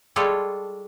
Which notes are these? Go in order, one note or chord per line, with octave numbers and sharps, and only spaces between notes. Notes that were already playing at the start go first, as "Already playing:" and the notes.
G3 G#3 F4 A4 C#5